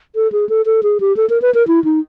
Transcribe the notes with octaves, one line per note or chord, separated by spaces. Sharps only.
A4
G#4
A4
A4
G#4
G4
A4
A#4
B4
A#4
E4
D#4